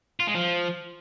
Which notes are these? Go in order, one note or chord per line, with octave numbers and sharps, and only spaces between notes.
F4
G#3
F3